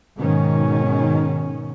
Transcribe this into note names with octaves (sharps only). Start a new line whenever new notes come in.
G#2 B2 D#3 C#4